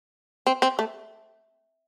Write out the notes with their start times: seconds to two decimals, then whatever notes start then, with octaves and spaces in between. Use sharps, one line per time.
0.47 C4
0.62 C4
0.79 A3